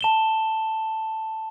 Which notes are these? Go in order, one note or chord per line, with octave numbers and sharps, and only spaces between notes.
A5 E7 G7